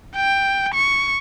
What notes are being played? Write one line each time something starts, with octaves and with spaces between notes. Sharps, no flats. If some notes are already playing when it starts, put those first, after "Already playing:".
G5
C#6